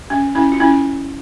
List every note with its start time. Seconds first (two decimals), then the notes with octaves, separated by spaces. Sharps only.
0.10 C#4
0.35 C#4 E4
0.52 F4
0.60 C#4 E4